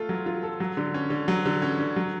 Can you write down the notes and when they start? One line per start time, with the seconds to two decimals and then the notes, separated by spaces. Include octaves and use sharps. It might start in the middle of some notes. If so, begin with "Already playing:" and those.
Already playing: A3 F4 A4
0.09 F#3
0.26 F4
0.43 A4
0.60 F#3
0.77 D3
0.94 C#4
1.10 D3
1.28 F#3
1.46 D3
1.62 C#4
1.79 D3
1.96 F#3